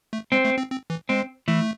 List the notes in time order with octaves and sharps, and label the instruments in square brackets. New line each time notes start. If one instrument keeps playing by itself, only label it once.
[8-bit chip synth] A3
[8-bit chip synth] G#3 [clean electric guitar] C4
[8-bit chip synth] A3
C4
C4
E3
[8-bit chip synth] G#3 [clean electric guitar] C4
[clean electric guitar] E3 [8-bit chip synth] A3